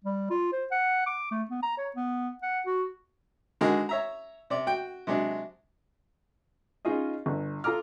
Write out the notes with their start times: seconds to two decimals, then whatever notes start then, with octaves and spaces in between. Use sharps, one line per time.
0.04 G3
0.30 F4
0.52 C5
0.72 F#5
1.07 D6
1.31 A3
1.51 B3
1.63 A#5
1.78 C#5
1.96 B3
2.42 F#5
2.66 F#4
3.61 D3 D#3 G#3 F#4 A#4
3.89 C#5 E5 A#5
4.50 C3 D5
4.67 F#4 G5
5.07 C3 F#3 G#3 D4
6.85 C#4 D#4 F4 G#4 D#5
7.26 G1
7.64 F4 A4 A#5 D6 F6